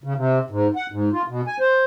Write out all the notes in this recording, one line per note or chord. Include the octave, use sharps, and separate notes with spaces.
C#3
C3
G#2
F#5
G#2
F4
B2
G#5
C5